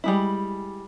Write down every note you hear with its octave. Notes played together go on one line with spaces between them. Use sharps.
G3 G#3 E4